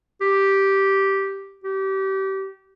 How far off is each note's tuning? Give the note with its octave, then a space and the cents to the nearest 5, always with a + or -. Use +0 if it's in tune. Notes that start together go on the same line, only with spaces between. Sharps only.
G4 -5
G4 -25